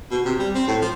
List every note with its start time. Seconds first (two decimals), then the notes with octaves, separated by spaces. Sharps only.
0.11 B2
0.25 C3
0.39 G3
0.55 C4
0.68 A2
0.82 F3